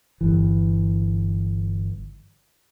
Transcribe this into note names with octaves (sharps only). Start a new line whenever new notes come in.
G1 E3